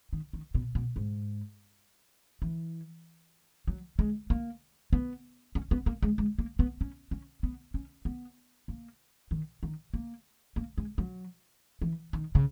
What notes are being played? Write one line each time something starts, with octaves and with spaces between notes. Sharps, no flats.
D#3
D#3
B2
B2
G#2
E3
F#3
G#3
A#3
B3
C#4
B3
A#3
G#3
G#3
A#3
B3
C#4
C#4
B3
C#4
B3
A#3
D#3
D#3
A#3
A#3
G#3
F#3
E3
D#3
C#3